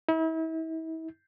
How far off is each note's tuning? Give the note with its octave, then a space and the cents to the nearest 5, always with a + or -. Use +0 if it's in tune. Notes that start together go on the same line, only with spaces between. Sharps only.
E4 -40